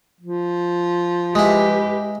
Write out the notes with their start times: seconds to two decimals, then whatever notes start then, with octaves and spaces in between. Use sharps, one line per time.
0.21 F3
1.35 G#3 E4 G4 B4